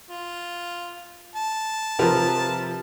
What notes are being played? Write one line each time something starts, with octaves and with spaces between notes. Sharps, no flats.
F4
A5
C3 F3 F4 A#4 B4